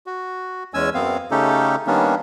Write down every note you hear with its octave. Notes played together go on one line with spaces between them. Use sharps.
F#4
E2 G#3 C#4 G#5 E6
F#2 B3 C4 F5
C#3 A3 C#4 D#4 G4 A4
D#3 G3 A#3 B3 C#4 D4